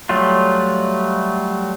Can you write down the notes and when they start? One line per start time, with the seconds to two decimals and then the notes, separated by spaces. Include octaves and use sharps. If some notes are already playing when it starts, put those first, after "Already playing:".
0.09 F#3 G3 A3 F4